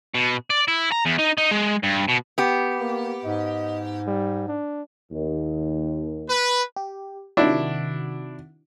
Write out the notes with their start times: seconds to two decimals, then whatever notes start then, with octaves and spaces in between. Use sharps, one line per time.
0.14 B2
0.50 D5
0.68 E4
0.92 A#5
1.06 E2
1.19 D#4
1.38 D#4
1.51 G#3
1.83 G2
2.09 B2
2.38 B3 G4
2.80 A#3
3.24 G#2 D#5
4.07 G3
4.48 D4
5.11 D#2
6.28 B4
6.76 G4
7.37 C3 D#3 D4 E4 F#4